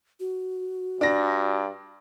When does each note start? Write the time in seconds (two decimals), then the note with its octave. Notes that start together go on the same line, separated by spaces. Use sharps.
0.20 F#4
1.01 G2 D4 A#6